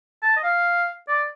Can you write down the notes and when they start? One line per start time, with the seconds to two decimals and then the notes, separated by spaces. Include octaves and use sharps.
0.23 A5
0.37 D#5
0.44 F5
1.08 D5